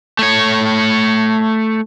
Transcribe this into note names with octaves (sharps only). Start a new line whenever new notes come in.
A3 C#5